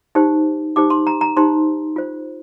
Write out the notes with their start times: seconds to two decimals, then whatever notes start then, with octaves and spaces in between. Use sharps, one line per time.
0.15 D#4 G4 C5
0.76 D#4 G4 C5 D6
0.90 C6
1.07 A#5
1.21 A#5
1.37 D#4 G4 C5 C6
1.96 F4 C5